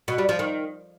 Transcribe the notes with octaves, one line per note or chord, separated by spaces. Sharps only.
B2
G3
F3
D#3